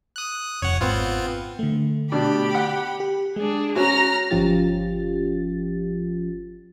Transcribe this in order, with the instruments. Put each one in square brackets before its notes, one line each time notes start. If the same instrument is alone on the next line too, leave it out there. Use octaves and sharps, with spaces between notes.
[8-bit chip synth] D#6 F#6
[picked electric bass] F1 [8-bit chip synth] C#5 F#5
[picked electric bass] G#1 [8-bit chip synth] B3 C4 F4
[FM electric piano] D3 A3
[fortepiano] B2 D4 [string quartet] G4 B5
[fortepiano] F#5
[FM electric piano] G4
[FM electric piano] G#3 [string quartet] D4 G#4
[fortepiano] C#4 F#4 [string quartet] A#5 F6 A#6
[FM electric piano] G1 F3 C#4 F4 G4 A6